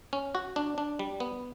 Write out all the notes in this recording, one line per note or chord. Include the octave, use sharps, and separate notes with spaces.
C#4
F#4
D4
D4
G3
B3